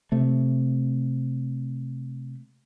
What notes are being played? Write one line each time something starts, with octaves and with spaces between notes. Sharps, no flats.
C3 A3